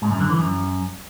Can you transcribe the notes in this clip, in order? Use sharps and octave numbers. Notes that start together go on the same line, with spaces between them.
G#2
F#2
D3
E3
F#2